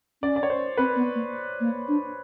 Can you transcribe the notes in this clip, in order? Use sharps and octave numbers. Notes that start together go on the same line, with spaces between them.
C#4 D5
D5
C#5
C5
C4 B4
B3
A#3
A#3
D4